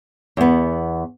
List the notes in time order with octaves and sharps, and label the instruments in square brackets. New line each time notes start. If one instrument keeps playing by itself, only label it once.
[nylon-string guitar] E2 B3